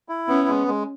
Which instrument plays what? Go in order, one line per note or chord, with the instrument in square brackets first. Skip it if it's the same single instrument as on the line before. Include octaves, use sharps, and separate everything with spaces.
[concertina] E4
[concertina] B3 [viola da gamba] C#4
[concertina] G#3
G#3